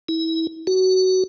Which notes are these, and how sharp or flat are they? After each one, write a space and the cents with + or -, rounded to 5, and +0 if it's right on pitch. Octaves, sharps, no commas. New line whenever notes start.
E4 -30
F#4 +20